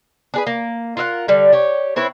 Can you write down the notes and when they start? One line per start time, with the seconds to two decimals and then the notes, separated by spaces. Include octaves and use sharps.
0.34 D4 G#4 B4
0.47 A#3
0.97 F4 A#4 E5 F#5
1.28 D3 G3
1.53 G4 C#5
1.96 C4 E4 B4 C#5